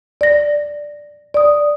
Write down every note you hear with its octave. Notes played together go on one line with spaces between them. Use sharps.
D5 A#6
D5 D#6